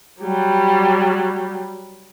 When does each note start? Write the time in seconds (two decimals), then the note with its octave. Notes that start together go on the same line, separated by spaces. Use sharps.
0.21 F#3 G3